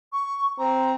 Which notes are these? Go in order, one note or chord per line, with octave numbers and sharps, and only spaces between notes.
C#6
C4 A#5